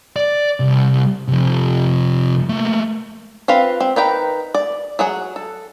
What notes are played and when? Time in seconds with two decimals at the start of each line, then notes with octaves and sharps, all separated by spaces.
0.16 D5
0.60 C2
1.28 C3 F3
2.49 A3 A#3
3.48 C4 F4 B4 F5
3.80 C4
3.96 D#3 B4 G5 A#5
4.55 D5
4.99 F#3 G#4 F#5
5.36 A4